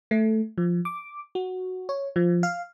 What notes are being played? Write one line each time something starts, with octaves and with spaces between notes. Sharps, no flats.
A3
F3
D6
F#4
C#5
F3
F5